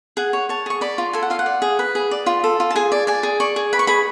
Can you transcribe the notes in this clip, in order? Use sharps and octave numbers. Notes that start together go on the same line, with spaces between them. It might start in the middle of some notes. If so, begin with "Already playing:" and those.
G#4 F#5
C#5
C#5 A5
G#4 C#6
D5 B5
F4
A4 G#5
F#5
F4 F5
F#5
D5
G#4
B4
G#4
D5
F4
A4
F4
A5
G#4 G#5
D5
D5 G#5
G#4
D5 C#6
G#4
B4 B5
C#6
G#4 B5